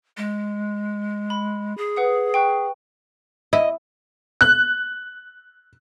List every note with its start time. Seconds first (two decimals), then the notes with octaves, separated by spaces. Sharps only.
0.17 G#3
1.30 B5
1.78 G#4
1.97 B4 F#5 D#6
2.34 G5 C#6 F#6
3.53 E4 D#5
4.41 F#6